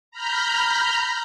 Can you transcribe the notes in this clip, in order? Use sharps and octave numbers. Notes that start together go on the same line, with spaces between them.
A#5 B5 F6 G6